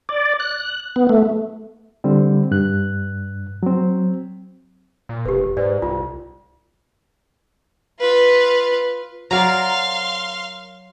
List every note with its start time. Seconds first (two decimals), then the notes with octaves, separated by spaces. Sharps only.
0.09 D5
0.40 F#6
0.96 B3
1.09 A3
2.04 D3 G3 C4
2.51 G2 F#6
3.63 F#3 C4
5.09 A#2
5.26 F1 G4 B4
5.57 G#2 B4 C5 D5
5.82 C2 F4
8.01 F4 B4
9.31 F#3 A#4 D5 F5 A#5 C6